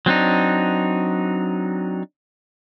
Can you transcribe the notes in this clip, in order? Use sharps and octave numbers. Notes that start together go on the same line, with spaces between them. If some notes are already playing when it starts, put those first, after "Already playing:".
F#3 C4 D4 D#4